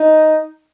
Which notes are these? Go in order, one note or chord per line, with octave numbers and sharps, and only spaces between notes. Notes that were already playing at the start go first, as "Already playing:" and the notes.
Already playing: D#4